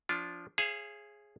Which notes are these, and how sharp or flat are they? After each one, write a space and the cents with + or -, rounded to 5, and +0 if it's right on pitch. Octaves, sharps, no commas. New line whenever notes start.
F3 +0 D4 -20 F4 +0
G#4 +0 C#5 -40 F5 -45